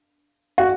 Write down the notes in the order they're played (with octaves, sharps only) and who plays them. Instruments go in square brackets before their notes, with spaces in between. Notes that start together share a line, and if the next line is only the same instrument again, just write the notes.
[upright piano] F#4